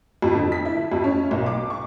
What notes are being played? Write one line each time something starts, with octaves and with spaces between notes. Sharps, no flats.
F2
D3
B6
E4
F2
C#4
B1
D6
C#6